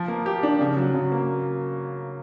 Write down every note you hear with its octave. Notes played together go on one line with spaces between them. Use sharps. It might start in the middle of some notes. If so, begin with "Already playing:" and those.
Already playing: F3
A#3
G4
D4
C#3
F#3
C#3
A#3